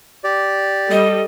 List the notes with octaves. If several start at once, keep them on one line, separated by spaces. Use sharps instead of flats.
G4 D5
G3 A4 D#5